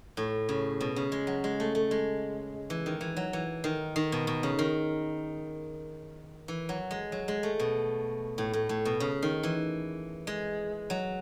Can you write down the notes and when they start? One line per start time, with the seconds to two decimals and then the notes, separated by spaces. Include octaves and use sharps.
0.17 A2
0.49 C#3
0.81 B2
0.96 C#3
1.12 G#3
1.27 F#3
1.44 G#3
1.60 A3
1.75 A3
1.91 G#3
2.70 E3
2.86 D#3
3.01 E3
3.17 F#3
3.33 E3
3.64 D#3
3.96 D#3
4.12 B2
4.27 B2
4.43 C#3
4.59 D#3
6.48 E3
6.69 F#3
6.91 G#3
7.12 F#3
7.28 G#3
7.43 A3
7.60 B2
8.38 A2
8.53 A2
8.69 A2
8.85 B2
9.00 C#3
9.22 D#3
9.43 E3
10.27 G#3
10.90 F#3